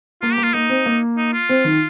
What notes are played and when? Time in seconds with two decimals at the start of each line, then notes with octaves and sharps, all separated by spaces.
0.22 A#3 F4
0.33 G4
0.38 A#3
0.43 F4
0.54 A#3 D#4
0.69 C4
0.86 A#3
1.17 D#4
1.33 F4
1.49 C4
1.64 D#3